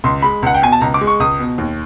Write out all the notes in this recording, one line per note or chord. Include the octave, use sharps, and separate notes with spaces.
C#2 C6
G#3 B5
C#2 F#5
G5
B2 G#5
A5
C#2 A#5
D6
G#3
C#6
C#2 D#6
B2
D#2